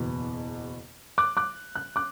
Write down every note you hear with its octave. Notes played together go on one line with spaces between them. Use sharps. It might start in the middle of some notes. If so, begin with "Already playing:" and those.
Already playing: F#1 E2 B2 B3
D6 F#6
D6 F#6
F#6
D6 F#6